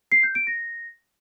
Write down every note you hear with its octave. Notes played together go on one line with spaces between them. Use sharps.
C7
G6
D7
A#6